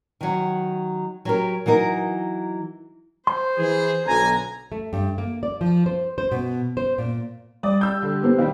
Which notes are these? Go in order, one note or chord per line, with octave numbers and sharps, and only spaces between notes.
D#3 F#3
F#3 G4 A#4
E3 F#3 D#4 A#4
C5 C6
E3 G#4
B1 D3 G#5 A#5
A3
G2
A#3
D5
F3
C5
C5
B2
C5
A#2
G3 D5 D#6
E6 G6
D3
B3 G4 C5
D#3 G3 F5 G5